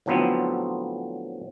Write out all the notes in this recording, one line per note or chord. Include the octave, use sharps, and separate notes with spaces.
A2 D3 F3 F#3 B3 C4